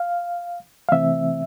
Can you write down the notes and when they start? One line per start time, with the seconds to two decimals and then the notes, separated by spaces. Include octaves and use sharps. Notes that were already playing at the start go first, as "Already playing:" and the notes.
Already playing: F5
0.89 F5
0.92 C3 E3 A3 C4 E5